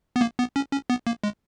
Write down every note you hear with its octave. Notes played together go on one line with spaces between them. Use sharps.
B3
A#3
B3
C#4
C#4
B3
A#3
G#3